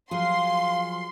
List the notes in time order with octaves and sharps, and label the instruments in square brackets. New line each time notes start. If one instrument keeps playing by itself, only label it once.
[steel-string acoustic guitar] F3 F#3 G#4 [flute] F5 [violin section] C6